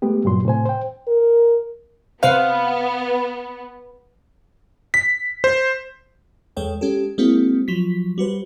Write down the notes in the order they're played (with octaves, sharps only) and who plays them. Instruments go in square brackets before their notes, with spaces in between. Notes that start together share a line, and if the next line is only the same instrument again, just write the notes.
[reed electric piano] G#3 A3 B3 G4
G2 A#2 F#3 F#4 C6
A2 C3 C5 G#5
C5 G5
[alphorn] A#4
[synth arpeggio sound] C3 C5 F#6 [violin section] B3 [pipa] F5
[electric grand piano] B6
C5
[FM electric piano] E2 G#3 A4 C#5 G5
G#3 C#4 G4 A4
G#3 A#3 C4 E4 F#4
F3 F#3 B6
G3 F#4 B4 C5